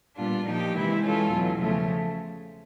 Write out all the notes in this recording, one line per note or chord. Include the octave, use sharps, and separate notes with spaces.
A#2 G3 B3 D4 F4
A#2 F3 A#3 D#4 G4
C3 E3 G#3 C4 E4
E3 G#3 C#4 F4 A4
E2 B2 F#3
C#3 F3 A3